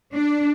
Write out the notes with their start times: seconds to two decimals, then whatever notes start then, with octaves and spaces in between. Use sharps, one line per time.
0.14 D4